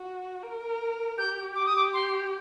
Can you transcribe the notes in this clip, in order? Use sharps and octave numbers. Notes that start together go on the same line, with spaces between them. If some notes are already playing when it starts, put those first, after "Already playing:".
Already playing: F#4
A#4
G4 G6
D6
D#6
D6
C6